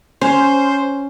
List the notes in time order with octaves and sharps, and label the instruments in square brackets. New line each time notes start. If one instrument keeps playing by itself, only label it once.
[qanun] C#4 [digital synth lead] C5